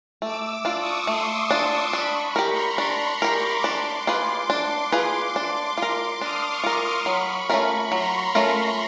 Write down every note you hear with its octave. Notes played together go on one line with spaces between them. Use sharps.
A3 D6 E6
D6 E6
D4 F4
C#6 D#6
A3 C6 D6
D4 F4
D4 B5 C#6
B5 C#6
G4 A#4
A#5 C6
D4 A#5 C6
B5 C#6
G4 A#4
C6 D6
D4
F4 G#4 B4
D4 C6 D6
F4 G#4 B4
D4
F4 A#4
D4 D#6 F6
C#6 D#6
F4 A#4
C6 D6
F#3 B5 C#6
A3 C#4 F4 A#4
F#3 A#5 C6
A3 C#4 F4 A#4